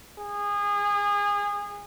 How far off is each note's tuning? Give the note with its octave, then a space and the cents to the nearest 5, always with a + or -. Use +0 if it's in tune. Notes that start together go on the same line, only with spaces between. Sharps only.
G#4 -25